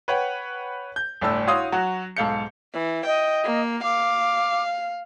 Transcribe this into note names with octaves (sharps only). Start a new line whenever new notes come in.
B4 C#5 F#5 G5
G6
G1 A2 D4 A5 E6
E4 F#4 C#5 F5 C6 D#6
F#3 F#4
B1 G#2 A4 F5 G6 C#7
E3
D#5 G5
A#3
F5 D6